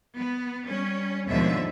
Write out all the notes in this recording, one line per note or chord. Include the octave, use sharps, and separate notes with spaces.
B3
G3 C#4
D#2 G#2 B2 D3 F3 E5